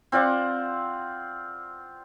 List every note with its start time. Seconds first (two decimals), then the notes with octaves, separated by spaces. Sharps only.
0.12 C4 F4 D5 F#5